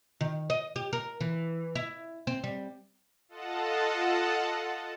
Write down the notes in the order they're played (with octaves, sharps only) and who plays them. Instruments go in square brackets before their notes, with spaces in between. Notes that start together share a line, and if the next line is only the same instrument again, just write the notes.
[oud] D#3
D#5
G4
A#4
E3
E4
C4
G3
[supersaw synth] F4 A4 D#5 F#5 A5